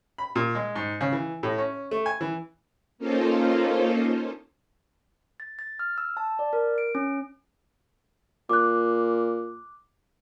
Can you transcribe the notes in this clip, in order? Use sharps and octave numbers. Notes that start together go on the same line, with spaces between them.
B5
A#2
G#3
G#2
C#3
E3
A2
C#4
A3
G#5
E3
A#3 C#4 D#4 F4 A4 C5
A6
A6
F6
E6
A5
D5
A#4
D7
C#4
A#2 D6 F#6